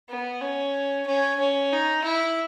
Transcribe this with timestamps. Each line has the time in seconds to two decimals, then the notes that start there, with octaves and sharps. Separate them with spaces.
0.09 B3
0.41 C#4
1.06 C#4
1.40 C#4
1.72 D#4
2.04 E4